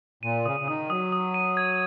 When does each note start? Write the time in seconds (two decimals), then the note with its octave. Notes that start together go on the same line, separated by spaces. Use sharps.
0.23 A#2 D#7
0.45 C#3 D#6
0.60 C#3
0.68 D#3 D#6
0.90 F#3 D#6
1.12 D#6
1.34 D#7
1.57 G#6